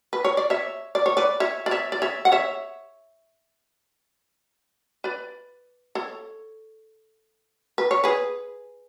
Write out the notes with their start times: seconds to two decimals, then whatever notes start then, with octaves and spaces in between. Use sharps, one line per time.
0.13 B4
0.24 C#5
0.37 D5
0.50 C#5 E5
0.95 D5
1.06 C#5
1.17 B4 D5
1.40 C#5 E5
1.66 D5
1.71 C#5 E5
1.92 D5
2.02 C#5 E5
2.25 F#5
2.32 C#5 E5
5.04 B4 D5
5.95 A4 C#5
7.78 B4
7.91 C#5
8.04 G#4 B4